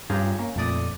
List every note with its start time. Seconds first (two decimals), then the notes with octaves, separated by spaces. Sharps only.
0.10 G2 C#4 F4 G4 G#4 A#5
0.38 A#3 C#4
0.56 F2 A#2 A3 D5 D#6